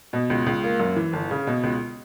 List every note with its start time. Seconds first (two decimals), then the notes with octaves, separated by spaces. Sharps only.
0.13 B2
0.30 C#2
0.46 C#2
0.64 A#3
0.80 F#2
0.96 E3
1.13 G1
1.31 C#3
1.47 B2
1.63 C#2